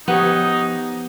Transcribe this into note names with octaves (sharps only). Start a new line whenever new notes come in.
F3 B3 D#4 G4 C#5